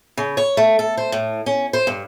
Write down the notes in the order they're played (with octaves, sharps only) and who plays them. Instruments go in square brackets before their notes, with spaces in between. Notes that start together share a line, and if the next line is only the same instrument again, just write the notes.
[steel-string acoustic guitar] C#3
C#5
A3
A4
C5
A2
C#4
C5
G2